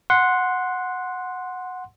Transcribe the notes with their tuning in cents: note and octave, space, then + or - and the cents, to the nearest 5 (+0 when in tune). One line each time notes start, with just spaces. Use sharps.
F#5 -10 C6 +0